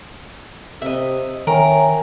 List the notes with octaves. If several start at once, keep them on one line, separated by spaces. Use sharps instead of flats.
C3 D#5 E5
D#3 A#4 C#5 E5 G5 G#5